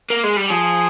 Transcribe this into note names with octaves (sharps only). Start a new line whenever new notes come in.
A#3
G#3
G3
F3 G#4